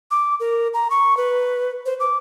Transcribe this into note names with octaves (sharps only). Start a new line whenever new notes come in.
D6
A#4
A#5
C#6
B4
C5
D6